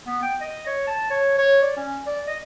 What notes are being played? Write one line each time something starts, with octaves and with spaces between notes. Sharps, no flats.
B3
G5
D#5
C#5
A5
C#5
C#5
D5
C#4
D5
D#5